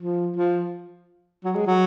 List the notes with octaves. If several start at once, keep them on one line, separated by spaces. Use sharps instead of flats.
F3
F3
F#3
G#3
F#3